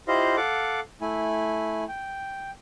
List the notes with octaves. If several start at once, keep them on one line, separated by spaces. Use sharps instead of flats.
E4 F4 G4 C5 D#5 F5
A4 F5 F#5 D6
A3 E4 G#5
G5